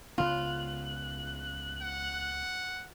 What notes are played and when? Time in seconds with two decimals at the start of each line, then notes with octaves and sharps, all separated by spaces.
0.18 C#2 C#3 B3 F4 F#6
1.82 F#5